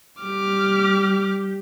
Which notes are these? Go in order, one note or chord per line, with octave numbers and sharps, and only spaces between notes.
G3 G4 D6 F6